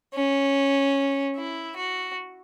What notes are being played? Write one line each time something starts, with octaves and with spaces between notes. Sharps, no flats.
C#4
E4
F#4